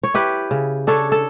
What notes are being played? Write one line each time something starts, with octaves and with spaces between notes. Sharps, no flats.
C#5
E4 G4 B4
C#3
D4 A4 C#5
A4